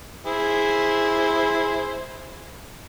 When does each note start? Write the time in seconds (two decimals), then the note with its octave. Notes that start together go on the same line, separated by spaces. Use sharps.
0.26 E4 G#4 C5